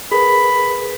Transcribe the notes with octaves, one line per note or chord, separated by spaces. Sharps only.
G#4 A#4 B4 B5